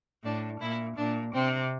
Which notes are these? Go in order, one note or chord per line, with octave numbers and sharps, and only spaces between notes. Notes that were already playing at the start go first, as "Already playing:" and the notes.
A2 D4
A#2 E4
A#2 D4
C3 C4